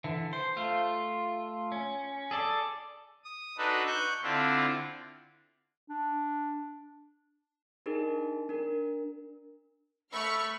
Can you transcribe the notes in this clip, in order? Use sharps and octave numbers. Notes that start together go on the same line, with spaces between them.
D3 E3
C5
A3 F4
C#4
G#4 A4 D5
D#6
D4 D#4 F#4 A4 B4
C#6 F#6 G6
D3 C4 D4 E4 F4
D4
D4 D#4 G#4 A#4
D4 A#4
A3 B5 C#6 F6